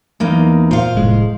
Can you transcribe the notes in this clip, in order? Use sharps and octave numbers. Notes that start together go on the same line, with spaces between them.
E2 A#3 D#4
A#2 C5 F5
F1 A2 G#3